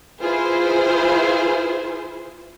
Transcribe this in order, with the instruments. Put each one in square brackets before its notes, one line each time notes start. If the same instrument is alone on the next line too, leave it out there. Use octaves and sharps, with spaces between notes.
[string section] E4 F4 G#4 B4 C5